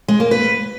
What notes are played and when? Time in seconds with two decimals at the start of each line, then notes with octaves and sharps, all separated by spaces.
0.08 G#3
0.20 A#3
0.31 B4